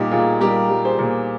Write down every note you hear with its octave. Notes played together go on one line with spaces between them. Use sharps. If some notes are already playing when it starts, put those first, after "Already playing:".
Already playing: A#2 G3 D#4 G4
A#2 F4 G#4
G3 G4 A#4
G3
G#4 C5
A#2